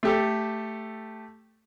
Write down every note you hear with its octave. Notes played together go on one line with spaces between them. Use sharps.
A3 G4 A4